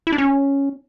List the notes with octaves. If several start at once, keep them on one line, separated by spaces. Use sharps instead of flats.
E4
D4
C#4